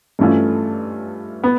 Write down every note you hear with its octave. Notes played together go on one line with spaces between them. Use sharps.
G2 E3 A3 C#4 F4
B3